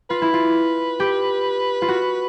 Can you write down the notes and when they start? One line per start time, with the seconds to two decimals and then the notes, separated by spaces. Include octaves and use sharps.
0.10 F4 B4
0.22 E4
0.34 F4
1.00 G4
1.82 F4
1.88 F#4